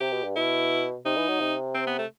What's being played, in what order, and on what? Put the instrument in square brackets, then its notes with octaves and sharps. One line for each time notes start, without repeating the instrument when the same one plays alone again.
[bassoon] C3 [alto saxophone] G4
[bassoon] B2
G2
[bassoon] B2 [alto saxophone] E4
[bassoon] C3 [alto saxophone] D#4
[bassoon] E3
F#3
C3
[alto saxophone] C4
B3
A3